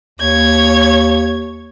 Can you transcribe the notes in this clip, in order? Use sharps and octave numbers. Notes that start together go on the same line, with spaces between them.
D#2 C#5 G#6